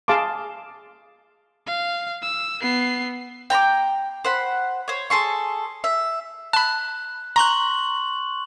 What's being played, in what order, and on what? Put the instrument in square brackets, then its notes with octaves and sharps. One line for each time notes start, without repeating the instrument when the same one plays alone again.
[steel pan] G#4 F5 A5 C6 D6
[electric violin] F5
E6
B3 C7
[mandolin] G5 A#5 B5 D6
C5 F#5 B5
C5 C#5
G#4 A4 C6 C#6
E5
[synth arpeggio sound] A5 B5 [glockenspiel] F#6
[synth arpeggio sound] A#5 F#6 [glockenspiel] C6 C#6 F#7